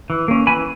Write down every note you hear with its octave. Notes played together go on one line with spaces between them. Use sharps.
E3
A#3 C#4
E3 G#5 B5